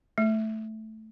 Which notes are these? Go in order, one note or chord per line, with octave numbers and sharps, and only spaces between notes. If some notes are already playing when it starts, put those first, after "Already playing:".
A3